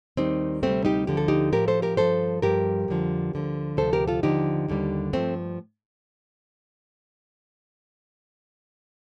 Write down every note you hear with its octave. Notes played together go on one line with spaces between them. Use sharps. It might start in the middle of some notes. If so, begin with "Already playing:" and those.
D#2 D#3 G3 C4 D#4
D2 C3 G3 A3 C4
D#4 G4
D2 D3 F3 G4
A4
D#4 G4
A2 F3 G4 A#4
A4 C5
G4 A#4
G2 F3 A4 C5
G2 F3 G4 A#4
F2 D3 F3
D2 D3 F3
D2 C3 F3 A4 C5
G4 A#4
F4 A4
D#2 D3 F3 D#4 G4
D#2 D3 G3
G2 F3 A3 C4